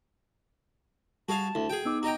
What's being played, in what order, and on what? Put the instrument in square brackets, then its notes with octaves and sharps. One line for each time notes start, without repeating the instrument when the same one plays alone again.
[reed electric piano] G3 [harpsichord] F#4 G#4 F5 [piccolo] A5
[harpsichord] D2 [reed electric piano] E4
[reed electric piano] F#4 [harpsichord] G#4 G5
[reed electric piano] B3 D#4 D6 [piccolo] E6
[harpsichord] F#4 D#5 G5 [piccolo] A#5